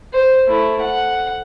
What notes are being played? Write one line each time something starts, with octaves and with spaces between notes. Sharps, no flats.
C5
A3 E4
F#5